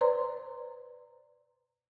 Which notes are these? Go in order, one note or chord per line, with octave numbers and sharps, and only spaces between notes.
B4 C5 D5 A#5 C6